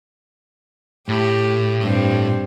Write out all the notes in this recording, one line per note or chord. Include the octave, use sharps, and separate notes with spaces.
A2 G4
G2 C4